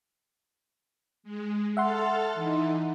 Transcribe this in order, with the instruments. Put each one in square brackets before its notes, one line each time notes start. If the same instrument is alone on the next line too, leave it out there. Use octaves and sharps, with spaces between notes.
[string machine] G#3
[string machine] A4 A5 F6 [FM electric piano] E5 F#5 C6
[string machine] E3 D#4